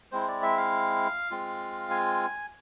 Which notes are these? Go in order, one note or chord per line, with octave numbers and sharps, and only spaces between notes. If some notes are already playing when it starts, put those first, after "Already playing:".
G#3 C4 E4 C5
D5
E5
F5
G#3 C4 F4
G#5